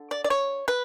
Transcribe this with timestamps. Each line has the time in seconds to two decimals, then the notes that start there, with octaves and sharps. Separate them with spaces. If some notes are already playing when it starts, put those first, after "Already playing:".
Already playing: D3
0.11 D5
0.24 D5
0.30 C#5
0.68 B4